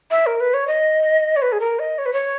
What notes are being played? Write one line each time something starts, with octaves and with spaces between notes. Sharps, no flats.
E5
A#4
B4
C#5
D#5
C#5
B4
G#4
A#4
D#5
C#5
B4
C#5